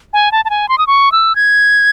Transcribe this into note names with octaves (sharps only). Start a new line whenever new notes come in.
G#5
A5
A5
G#5
C6
D#6
C#6
E6
G#6